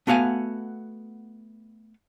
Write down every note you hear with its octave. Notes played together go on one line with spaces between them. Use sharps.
A3 B3 F#4 F5 G#5